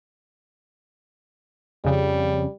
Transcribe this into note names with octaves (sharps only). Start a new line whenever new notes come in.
F2 C#3 G3